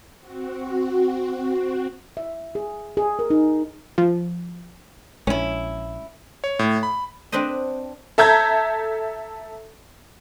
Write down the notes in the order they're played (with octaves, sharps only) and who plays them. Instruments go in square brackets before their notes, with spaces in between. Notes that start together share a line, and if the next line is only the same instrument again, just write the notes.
[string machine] C4 F#4
[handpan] E5
G#4
G#4
A#4
D#4
[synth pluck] F3
[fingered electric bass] A#1 G#3 [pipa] C#4 E4
[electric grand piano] C#5
A2
B5
[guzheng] C4 D4 B4 C5 D#5
[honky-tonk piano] A4 E5 A5 A#5 G6 G#6